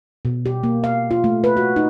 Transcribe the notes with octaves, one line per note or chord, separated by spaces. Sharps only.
B2
G4
A#3
F5
F4
A3
B4
F#4
D#4